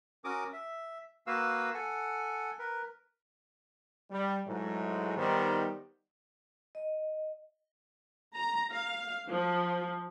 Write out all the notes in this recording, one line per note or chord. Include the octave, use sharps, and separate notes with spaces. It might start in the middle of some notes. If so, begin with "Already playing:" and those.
C#4 F#4 A#4 D6 D#6
E5
A#3 F#4 B4 F5 E6
A4 F#5 G#5
A#4 B4
G3
G#2 E3 F#3 G#3 A3
D#3 G3 B3 D#4 C5
D#5
A#5
F5
F3